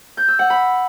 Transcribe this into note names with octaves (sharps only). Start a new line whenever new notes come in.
G6
E6
F#5
B5